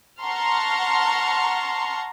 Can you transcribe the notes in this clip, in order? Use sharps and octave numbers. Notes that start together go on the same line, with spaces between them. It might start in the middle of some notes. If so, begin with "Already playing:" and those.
F#5 A5 A#5 C6 C#6 F6